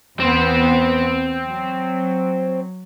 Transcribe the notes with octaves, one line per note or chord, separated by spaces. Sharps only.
E2 B3 C4 C5
F#3